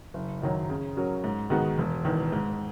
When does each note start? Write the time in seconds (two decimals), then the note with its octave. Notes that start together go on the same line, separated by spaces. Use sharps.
0.14 F#1
0.42 F#2 D#3 F#3
0.70 C#3
0.97 F#3 C#4 F#4 A#4
1.24 G#2
1.50 D#3 G#3 B3 F#4
1.78 E1
2.05 E2 D#3
2.32 G#2